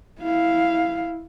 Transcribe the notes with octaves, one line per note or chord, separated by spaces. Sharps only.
E4 F5